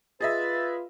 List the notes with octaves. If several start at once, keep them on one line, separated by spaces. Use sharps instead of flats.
F4 G#4 B4 D#5 E5 A6